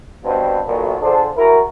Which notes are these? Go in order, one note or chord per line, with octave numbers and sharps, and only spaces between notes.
G2 B2 G3 B3 C4
B1 A#2
D3 D4 F4 G#4 A4 C5
E2 E4 F#4 A#4